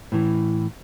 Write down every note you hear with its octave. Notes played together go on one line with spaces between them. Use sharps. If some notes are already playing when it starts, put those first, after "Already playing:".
A2 E3